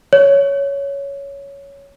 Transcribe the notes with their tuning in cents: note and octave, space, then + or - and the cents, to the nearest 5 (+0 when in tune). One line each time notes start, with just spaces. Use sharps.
C#5 +10